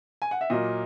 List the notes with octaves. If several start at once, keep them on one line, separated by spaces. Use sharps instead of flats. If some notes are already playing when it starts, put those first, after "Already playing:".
G#5
F#5
E5
A#2 F#3 A#3 D#5